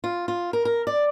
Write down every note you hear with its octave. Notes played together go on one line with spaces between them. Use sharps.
F4
F4
A#4
A#4
D5